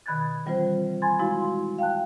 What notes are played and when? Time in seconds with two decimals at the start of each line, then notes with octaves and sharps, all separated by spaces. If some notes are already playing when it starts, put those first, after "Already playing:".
0.06 B2 D#3 B5 F#6 G#6 A6
0.46 E3 G3 C4 F4 C5
1.02 G#5 B5 C6 G#6 A6
1.19 G#3 E4 F#4 F5 C6
1.78 F5 G5 A5 F#6